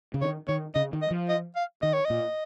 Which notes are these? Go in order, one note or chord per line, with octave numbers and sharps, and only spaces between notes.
C#3
D#3 C#5
D#3 C#5
C#3 D#5
D#3
D#5
F3
D#5
F5
D#3 D#5
C#5
A#2 D#5